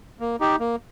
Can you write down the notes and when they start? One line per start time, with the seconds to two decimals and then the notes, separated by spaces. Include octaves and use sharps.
0.20 A#3
0.40 D#4 G4
0.60 A#3